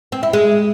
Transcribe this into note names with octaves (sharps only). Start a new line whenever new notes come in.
C4
E4
G#3